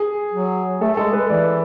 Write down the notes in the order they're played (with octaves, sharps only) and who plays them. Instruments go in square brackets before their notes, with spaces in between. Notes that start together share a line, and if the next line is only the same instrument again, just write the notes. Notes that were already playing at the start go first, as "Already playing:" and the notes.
Already playing: [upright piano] G#4
[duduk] F#3
[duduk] A3 [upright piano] A4
[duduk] G#3 [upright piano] A4
[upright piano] B4
[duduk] E3 [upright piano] D5